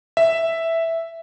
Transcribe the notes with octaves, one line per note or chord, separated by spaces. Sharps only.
E5